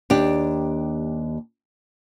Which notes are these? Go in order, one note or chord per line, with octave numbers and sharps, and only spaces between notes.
D#2 D4 G4